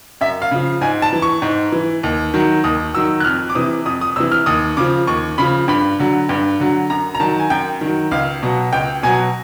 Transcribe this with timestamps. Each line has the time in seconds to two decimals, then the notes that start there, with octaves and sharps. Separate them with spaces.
0.21 F#2 E5
0.42 F5
0.51 C#3 F3
0.81 G#2 G#5
1.02 A5
1.13 E3
1.22 C#6
1.42 G#2
1.72 E3
2.03 D#2
2.34 D#3 F#3
2.64 D#2 D#6
2.94 D#3 F#3 E6
3.20 F#6
3.24 F2 F6
3.50 D6
3.55 C3 E3 D#6
3.86 F2 D#6
4.01 D#6
4.16 C3 E3 E6
4.32 F6
4.46 D#2 D#6
4.77 C#3 F3 D6
5.07 D#2 C#6
5.38 C#3 F3 B5
5.68 G2 B5
5.99 D3 F#3
6.29 G2
6.60 D3 F#3
6.90 F#2 A#5
7.15 A#5
7.20 D#3 F#3 A5
7.39 G#5
7.50 F#2 G5
7.81 D#3 F#3
8.11 C#2 F5
8.43 B2 F#3
8.73 C#2 G5
9.03 B2 F#3 G#5